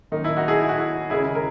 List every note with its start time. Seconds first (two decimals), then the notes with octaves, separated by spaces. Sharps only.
0.12 F#2 D#3 A#3 D#4
0.24 E4
0.37 D#4 F#4
0.48 E4 G#4
0.61 E4
0.69 F#4
0.77 E4
1.10 E1 D#2 C#3 G#3 E4 G#4
1.35 A#4